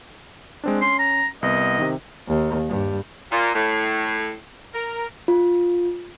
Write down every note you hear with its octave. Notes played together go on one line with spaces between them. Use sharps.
G#3 C4 D4
C#4 C6
A#5
C2 B3 D#5
C3 D#3
D#2
G2
A#2
A2
A#4
F4